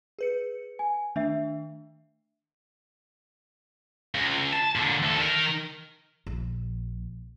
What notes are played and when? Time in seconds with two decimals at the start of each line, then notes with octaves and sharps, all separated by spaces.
0.19 G#4 B4 C#7
0.79 G#5
1.16 D#3 A3 D4 E5 C7
4.15 C#2
4.53 A5
4.76 A#2 D3
5.03 D2 A4
5.20 D#3 A#4
6.27 A#1